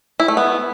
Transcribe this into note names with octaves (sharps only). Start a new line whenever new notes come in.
E4
A3
B3